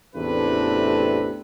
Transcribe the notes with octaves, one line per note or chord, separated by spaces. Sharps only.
A1 E2 C3 A3 D4 B4